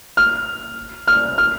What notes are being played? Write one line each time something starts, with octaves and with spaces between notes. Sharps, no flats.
F6
F6
F6